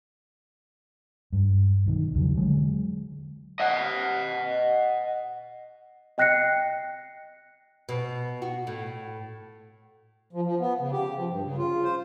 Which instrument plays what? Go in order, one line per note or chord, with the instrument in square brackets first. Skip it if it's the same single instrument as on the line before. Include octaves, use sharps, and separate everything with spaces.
[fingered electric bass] G2
B1 D#3
E2 C#3 E3 F#3
D3 F#3 G#3
[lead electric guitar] D#5 F#5
[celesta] D#5 G5 F#6 A#6 C7 C#7
[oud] B2
F#4
A2
[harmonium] F3
F3
B3
C#3
G4
F3
G2
C#3
F4
C5